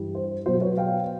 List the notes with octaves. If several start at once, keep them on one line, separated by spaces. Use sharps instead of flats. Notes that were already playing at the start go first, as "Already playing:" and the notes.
Already playing: G2 E3 G3
C5
B2 F#3 C5
B4 C#5
F5 G5